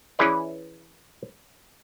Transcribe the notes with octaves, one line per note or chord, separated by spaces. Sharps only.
E3 C#4 E4 G#4 B4 D5